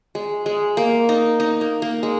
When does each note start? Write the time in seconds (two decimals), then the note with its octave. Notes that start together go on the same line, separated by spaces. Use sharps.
0.15 G#3
0.46 G#3
0.77 A#3
1.09 D#4
1.40 D#4
1.61 A#3
1.82 A#3
2.03 G#3